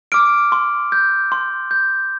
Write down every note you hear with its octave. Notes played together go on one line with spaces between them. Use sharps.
D6 F6 D7
C6
G6
C6
G6